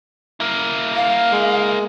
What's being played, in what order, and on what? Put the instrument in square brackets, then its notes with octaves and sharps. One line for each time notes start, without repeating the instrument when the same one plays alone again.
[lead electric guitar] A#3 E4
[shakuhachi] F5
[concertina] G#3